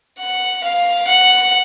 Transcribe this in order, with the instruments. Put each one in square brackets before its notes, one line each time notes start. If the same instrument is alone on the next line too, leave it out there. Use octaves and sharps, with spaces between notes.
[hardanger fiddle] F#5
F5
F#5